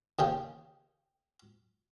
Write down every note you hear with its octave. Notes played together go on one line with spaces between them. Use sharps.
D#2 C#3 G5